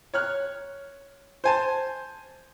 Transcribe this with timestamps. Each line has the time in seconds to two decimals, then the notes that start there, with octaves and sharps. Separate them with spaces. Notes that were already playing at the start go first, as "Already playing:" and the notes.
0.14 C#5 F6 F#6
1.44 C5 G#5 A5